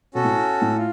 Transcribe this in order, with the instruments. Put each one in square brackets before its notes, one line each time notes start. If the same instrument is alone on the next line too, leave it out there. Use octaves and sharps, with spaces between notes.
[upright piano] B2 [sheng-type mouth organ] C#4 F#4 A4
[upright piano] A2
A2
[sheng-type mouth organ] F4